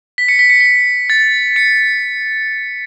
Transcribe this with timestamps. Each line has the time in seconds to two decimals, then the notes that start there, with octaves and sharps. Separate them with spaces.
0.18 B6
0.28 C#7
0.39 B6
0.50 C#7
0.60 B6
1.10 A6
1.56 C#7